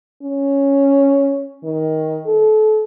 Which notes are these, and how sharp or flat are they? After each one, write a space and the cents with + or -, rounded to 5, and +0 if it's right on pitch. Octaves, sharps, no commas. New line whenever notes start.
C#4 +0
D#3 +15
A4 -30